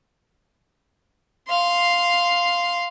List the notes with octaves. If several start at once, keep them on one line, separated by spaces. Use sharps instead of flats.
F5 C6